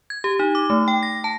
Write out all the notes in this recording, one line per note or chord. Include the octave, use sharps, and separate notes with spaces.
G#6
G4
D#4
D6
A3
G5
A#6
A5